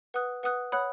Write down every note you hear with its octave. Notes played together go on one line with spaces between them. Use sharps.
B4 F#5 D#6 F#6
B4 F#5 D#6 F#6
C#5 F#5 B5 D#6 F#6